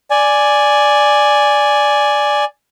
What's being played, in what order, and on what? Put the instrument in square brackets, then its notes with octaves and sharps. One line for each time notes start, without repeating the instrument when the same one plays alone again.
[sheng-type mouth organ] D5 G#5